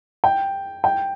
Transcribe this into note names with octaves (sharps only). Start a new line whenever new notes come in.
G5
G5